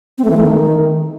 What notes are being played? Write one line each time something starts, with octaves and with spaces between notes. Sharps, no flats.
C4
A3
E3
A3
D#3